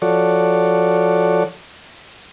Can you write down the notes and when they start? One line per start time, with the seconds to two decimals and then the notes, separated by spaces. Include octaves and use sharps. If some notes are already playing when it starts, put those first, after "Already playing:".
0.02 F3 F#4 A4 C#5 D5